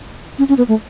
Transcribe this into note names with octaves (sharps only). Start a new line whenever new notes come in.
C#4
C#4
B3
A3